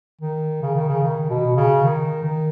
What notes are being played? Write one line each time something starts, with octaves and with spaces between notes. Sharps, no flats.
D#3
C#3
D#3
C#3
D#3
B2
C#3
D#3
D#3